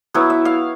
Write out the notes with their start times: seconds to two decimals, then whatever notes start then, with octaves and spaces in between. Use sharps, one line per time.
0.14 F#3 B3 E4 C#5
0.30 E5
0.45 F5